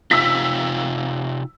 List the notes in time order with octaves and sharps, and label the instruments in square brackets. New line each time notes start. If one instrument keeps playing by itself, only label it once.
[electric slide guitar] C3 D#4 F4 [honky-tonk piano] E6 B6